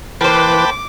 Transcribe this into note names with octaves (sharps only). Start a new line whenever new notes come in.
E3 A#3 B4 C5 G5 A5 B5 D6